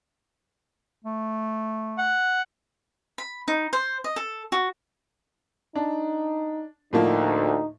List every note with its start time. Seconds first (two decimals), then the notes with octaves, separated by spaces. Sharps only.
1.05 A3
1.99 F#5
3.18 B5
3.48 D#4
3.73 C5
4.04 D#5
4.16 A4
4.52 F#4
5.75 D4 D#4
6.93 D2 A2 F3 A#3 D#4